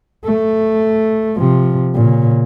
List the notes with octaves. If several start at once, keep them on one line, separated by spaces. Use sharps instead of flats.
A3
C3 F3
A#2 C#3